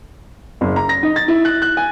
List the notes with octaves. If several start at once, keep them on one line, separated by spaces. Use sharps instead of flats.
F#1
A#5
A#6
D#4
A6
E4
F#6
F#6
G#5